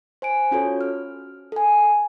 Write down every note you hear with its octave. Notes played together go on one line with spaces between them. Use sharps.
C5 G#5 D7
C#4 F4 F#4 A4 C#5
F6
A4 G#5